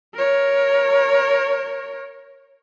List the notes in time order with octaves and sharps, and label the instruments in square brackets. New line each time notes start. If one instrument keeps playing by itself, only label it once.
[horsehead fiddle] A#4 C#5